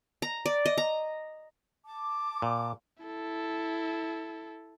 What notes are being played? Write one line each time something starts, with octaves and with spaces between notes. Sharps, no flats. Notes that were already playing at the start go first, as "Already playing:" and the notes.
A#5
D5
D#5
A#5
A5 D6
A#2
E4 A4